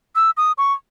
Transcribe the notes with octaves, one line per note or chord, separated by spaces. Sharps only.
E6
D#6
C#6